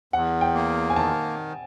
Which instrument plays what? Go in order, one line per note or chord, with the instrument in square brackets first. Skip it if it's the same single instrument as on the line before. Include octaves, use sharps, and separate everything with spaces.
[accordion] E2 [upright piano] F#5
[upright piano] G5
[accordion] A#3
[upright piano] G#5
[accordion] D#3 [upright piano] A5